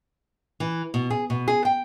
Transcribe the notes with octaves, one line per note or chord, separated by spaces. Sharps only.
E3
B2
G#4
B2
G#4
G5